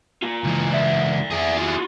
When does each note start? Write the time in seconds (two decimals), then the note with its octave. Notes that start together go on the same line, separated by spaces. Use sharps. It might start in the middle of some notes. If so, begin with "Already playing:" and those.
0.22 A#3 F4
0.45 C#2 E3
0.70 D5 E5
1.31 E4 G#4
1.57 F4 F#4